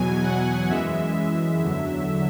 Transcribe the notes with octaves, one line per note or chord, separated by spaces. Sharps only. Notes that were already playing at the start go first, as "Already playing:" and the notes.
Already playing: E2 B2 F#3 G#5
F#5
F#2 E3 G#3 E5
E2 D3 F#3